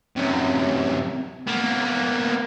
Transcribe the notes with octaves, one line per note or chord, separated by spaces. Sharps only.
F#2 C3
A#3 B3